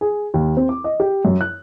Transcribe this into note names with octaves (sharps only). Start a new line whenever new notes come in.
G#4
D#2
C4
D6
D#5
G4
F#2
F#6